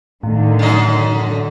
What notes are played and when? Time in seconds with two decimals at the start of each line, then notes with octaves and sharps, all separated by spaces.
0.23 A2 D3 D#3
0.59 F#2 D#5
1.15 D3